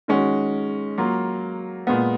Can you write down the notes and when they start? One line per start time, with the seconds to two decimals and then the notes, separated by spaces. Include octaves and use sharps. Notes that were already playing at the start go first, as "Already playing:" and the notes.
0.08 D#3 G#3 C#4 F#4
0.98 F#3 A#3 F4
1.87 A#2 G#3 B3